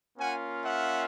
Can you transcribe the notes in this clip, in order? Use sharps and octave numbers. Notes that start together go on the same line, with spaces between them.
A#3 C#4 F4 F#5 G#5
E5 F#5